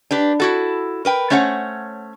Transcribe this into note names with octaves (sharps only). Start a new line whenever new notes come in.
D4 G4 B4
E4 F#4 A4
A#4 B4 G5
A3 C#4 C5 C#5 F#5